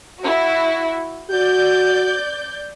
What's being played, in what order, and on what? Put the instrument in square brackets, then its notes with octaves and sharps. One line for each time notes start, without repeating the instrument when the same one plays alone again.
[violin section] E4 F#4
[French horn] F#4 [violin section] D5 G6